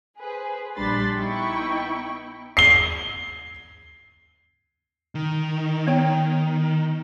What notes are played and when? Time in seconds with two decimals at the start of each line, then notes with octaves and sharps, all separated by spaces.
0.19 G#4 B4 C5
0.77 A#1 G3 D4 B5 C6 A6
1.15 B3 D#4 E4 G5 B5 C#6
2.57 C7 G7
5.15 D#3
5.87 B3 C#5 G5